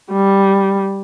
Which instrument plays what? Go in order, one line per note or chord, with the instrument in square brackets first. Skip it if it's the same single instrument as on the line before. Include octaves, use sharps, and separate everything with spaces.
[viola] G3